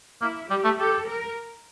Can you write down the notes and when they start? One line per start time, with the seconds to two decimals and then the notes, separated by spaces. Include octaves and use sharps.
0.21 A#3 E4
0.50 G3 G4
0.64 A3
0.78 G4 A4
1.07 A#4